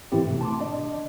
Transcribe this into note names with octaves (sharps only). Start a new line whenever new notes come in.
G#2 D#3 E3 C4 E4 G4
B2 A3
A5 C6 D6
D4 D5 D#5